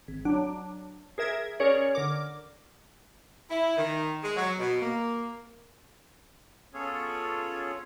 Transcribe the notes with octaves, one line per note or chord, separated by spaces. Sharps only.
G#1
F#3 D4
G#4 A#4 E5 G#6
C#4 G#4 A#4 C#5 D5
D3 A#4 D6
E4
D#3
G#3
F#3
B2
A#3
B3 C#4 F4 G#4 A4 C#5